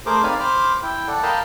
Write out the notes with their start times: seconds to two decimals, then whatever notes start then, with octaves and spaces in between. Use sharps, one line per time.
0.06 A3 G#4 A#4 C5 D6
0.23 C4 D#4 D5 F5 G#5 B5
0.40 C5 B5 D6 F6
0.83 E4 G5
1.08 A4 D5 F#5
1.23 A#4 D#5 F5 G5 A5 B5